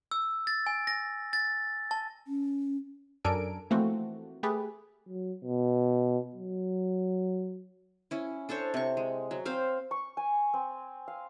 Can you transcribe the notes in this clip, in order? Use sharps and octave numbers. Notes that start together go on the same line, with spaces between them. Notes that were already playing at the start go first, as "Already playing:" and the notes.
E6
A6
G#5
A#6
A6
A5
C#4
F#2 D4 A4 A#4 G#5 D7
E3 F3 A3 A#3 C4 F#4
A3 G4 G#4 B4
F#3
B2
F#3
C#4 E4
D4 A4 C5 C#5
C3 C#6
G#3
F#3
C4 C5 F5
C#6
G#5
C4
F5